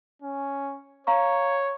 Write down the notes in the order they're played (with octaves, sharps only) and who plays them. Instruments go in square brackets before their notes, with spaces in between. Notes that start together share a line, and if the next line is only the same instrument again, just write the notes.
[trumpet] C#4
[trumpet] C#5 [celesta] F5 A#5 C#6